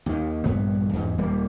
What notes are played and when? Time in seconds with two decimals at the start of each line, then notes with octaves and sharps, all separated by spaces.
0.06 D#2 D#3
0.44 A#1 G2 B3
0.93 E2 G#2
1.18 D#1 G3 A#3